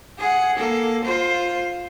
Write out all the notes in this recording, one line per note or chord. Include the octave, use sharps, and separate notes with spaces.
G#4 F#5
A#3 A4
F4 C5